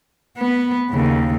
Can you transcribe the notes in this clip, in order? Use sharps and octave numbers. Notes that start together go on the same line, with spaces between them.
B3 B4
D#2 C#3